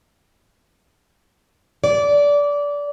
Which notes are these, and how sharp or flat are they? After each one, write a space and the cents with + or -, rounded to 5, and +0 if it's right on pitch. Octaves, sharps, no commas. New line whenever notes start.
D5 -20